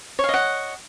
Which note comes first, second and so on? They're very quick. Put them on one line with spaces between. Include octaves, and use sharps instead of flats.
C#5 F5 D#5 F#5